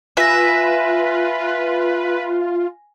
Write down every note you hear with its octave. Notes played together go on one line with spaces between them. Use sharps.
F4 B4 E5 G#5 A#6